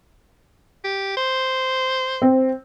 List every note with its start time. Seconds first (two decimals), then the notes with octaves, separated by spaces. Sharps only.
0.84 G4
1.17 C5
2.22 C4